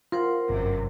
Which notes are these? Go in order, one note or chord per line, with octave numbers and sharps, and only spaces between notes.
F4 A#4 C5 F#5
G1 F#2 C3